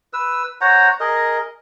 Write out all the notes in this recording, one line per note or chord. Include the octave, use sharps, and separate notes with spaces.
B4 E6
C5 C#5 F#5 A#5
G#4 A#4 D#5